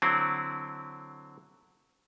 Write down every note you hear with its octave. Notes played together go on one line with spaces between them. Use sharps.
D3 F#3 C4 E4